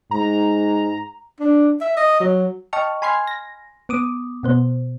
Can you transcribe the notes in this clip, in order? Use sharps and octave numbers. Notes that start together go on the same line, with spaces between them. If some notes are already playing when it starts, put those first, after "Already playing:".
G#2 A#5
D4
E5
D#5
F#3
D#5 G5 A5 C#6 F6
G#5 B5 C6 F6 G#6 C7
A#6
B3 D6 D#6
B2 B3 C5